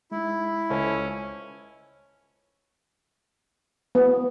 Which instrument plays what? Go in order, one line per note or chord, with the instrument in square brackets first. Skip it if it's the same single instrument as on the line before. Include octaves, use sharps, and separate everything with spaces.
[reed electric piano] G#3 D#4 [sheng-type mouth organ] E4
[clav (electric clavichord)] C#2 [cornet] C#4 [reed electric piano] A4 C5 A5
[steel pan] B3